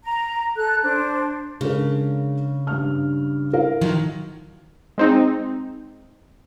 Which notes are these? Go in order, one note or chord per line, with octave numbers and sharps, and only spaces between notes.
A#5
A4 F#6
D4 C5
C#3 G#3 D4 A#4
G2 F6
E4 A#4 F5
D#3 F3 F#3
G#3 C4 D#4